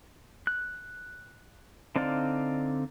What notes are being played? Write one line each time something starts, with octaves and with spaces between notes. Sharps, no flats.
F#6
D3 C4 D#4 D5 F5